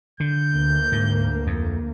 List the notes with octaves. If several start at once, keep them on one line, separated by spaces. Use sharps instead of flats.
D3 G6
D2 A#3
G#2
F2